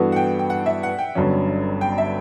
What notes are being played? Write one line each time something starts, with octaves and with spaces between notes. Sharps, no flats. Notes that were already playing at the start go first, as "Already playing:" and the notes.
Already playing: G2 E3 B3 F#4 A4
F#5
G5
G5
F#5
E5
F#5
G5
G1 G2 F#3 C#4
G5
E5